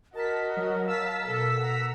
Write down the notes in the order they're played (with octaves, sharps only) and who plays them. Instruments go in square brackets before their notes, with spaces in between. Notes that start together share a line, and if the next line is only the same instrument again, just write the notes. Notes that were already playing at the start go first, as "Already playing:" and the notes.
[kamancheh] F#4 D#5 [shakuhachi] A#4 [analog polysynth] A5 B6
[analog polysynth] F#3
[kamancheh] F5 A5 [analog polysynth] E6 B6
[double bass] B2 [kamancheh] A4
[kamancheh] F#5 A#5